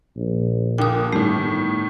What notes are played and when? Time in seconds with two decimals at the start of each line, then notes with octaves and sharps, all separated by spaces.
0.16 A#1
0.78 A#2 D3 G5 D#6
1.13 G1 A2 D#3 G3 A3